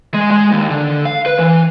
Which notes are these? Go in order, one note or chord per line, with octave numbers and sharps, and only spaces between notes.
G#3
G#3
D#2
D3
F5
B4
E3